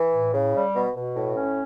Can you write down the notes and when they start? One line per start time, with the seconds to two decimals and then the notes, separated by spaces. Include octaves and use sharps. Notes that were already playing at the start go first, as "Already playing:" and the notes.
Already playing: E3
0.13 A2
0.34 C#3
0.55 G3
0.75 B2
0.95 B2
1.15 A2
1.36 C#4